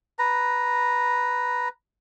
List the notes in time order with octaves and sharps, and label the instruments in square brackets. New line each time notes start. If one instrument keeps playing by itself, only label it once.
[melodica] B4 A#5